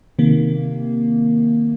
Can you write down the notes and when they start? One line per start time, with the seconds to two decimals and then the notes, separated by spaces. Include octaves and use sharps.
0.19 C3 D#3 A#3